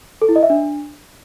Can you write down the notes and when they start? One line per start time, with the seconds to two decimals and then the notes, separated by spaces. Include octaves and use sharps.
0.22 A4
0.29 E4
0.36 D#5
0.43 E5
0.50 D4